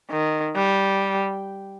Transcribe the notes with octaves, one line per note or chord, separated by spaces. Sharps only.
D#3
G3